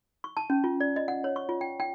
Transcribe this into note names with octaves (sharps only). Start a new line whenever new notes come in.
C#6
A5
C#4
F4
D5
D#5
F#5
C#5
C#6
F4
G5
G5